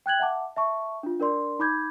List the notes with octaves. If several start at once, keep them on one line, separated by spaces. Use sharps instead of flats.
G5 F#6 G#6 F#7
E5 F#5 A5 D6
E5 A5 C#6
D4 F4
D4 A#4 D5 C6
D#4 B5 D6 G6 G#6